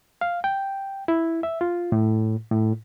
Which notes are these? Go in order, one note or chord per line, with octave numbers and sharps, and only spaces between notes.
F5
G5
E4
E5
F4
A2
A2